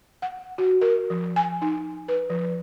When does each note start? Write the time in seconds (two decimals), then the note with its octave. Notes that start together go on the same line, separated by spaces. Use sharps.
0.22 F#5
0.58 F#4
0.81 A#4
1.10 F3
1.36 G#5
1.62 D#4
2.08 B4
2.30 F3